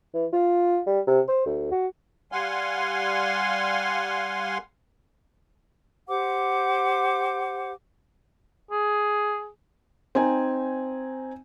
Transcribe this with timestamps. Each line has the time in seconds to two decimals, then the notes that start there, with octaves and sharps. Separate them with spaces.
0.14 E3
0.33 F4
0.87 G3
1.07 C3
1.28 C5
1.46 D2
1.71 F#4
2.32 G3 F5 F#5 G#5 C6
6.09 G4 C5 F#5 D6
8.71 G#4
10.15 C4 D#4 G#5